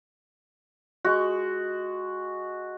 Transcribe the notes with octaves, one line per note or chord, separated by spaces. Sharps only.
G#3 F#4